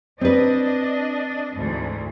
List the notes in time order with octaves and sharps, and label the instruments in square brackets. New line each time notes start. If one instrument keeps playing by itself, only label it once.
[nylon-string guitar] C4 B4 [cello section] D4 D#5
[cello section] D2 G#2 E3